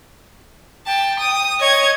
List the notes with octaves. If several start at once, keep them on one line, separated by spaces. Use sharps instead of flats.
G5 A5
D#6
C#5 D#5 G#6